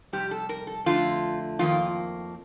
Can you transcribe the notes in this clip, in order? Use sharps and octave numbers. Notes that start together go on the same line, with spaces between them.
F2 C3 G3 G4
A4
A#4
A4
F2 D3 A3 F4
F2 D#3 A#3 F4